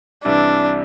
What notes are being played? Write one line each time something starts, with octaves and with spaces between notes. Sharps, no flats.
C2 C3 E3 G3 D4 E4